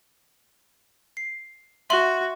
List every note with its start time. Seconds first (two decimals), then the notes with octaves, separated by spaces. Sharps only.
1.17 C7
1.90 F#4 E5 C6 F#7